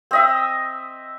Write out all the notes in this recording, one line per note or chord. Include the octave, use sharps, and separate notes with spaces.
C4 D#5 E5